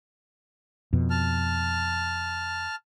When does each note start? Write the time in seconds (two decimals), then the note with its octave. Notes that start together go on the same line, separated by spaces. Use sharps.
0.93 F2 B2
1.10 A5 F6